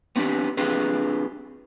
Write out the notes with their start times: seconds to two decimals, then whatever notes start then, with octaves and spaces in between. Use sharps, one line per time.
0.16 B3 C4 D4 F4 G4
0.57 C4 D4 F4 G4 G#4 B4